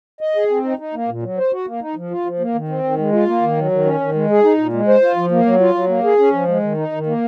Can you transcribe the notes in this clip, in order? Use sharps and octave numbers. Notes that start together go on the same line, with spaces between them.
D#5
G#4
C4
D#4
D#4
A#3
A#2
F#3
C5
F#4
A#3
D#4
F3
F4
F3
A#3
D#3
C4
D#3
G#3
F4
A#3
D#3
F#3
D#3
C#4
D#3
G#3
G#4
D#4
A#2
G#3
C5
F4
F3
A#3
F#3
F4
F#3
A#3
G#4
C#4
F3
G#3
D#3
D#4
D#3
A#3